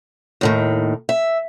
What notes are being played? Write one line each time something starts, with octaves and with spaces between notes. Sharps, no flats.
D#2 A2 D#3
E5